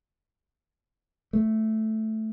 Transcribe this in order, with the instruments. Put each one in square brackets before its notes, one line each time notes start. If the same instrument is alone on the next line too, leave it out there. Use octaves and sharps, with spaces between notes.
[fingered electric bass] A3